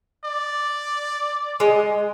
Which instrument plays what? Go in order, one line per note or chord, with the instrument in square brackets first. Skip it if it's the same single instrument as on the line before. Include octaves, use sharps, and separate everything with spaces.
[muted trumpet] D5
[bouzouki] G#3 D#5